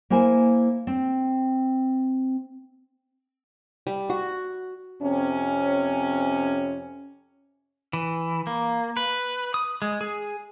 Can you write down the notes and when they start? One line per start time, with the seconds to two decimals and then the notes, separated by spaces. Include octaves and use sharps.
0.10 A#3 E4 C5 G#5
0.87 C4
3.87 G3
4.09 F#4
5.02 F2 C3 C#4
7.93 E3
8.47 A#3
8.97 B4
9.54 D#6
9.82 G#3
10.01 G#4